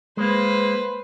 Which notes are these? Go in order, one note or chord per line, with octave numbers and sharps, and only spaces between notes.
G#3 A#3 B4 C5